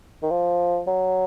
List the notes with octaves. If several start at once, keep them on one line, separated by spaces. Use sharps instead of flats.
D#3
F3
F#3